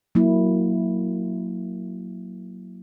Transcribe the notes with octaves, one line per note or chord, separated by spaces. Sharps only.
F#3 A#3 E4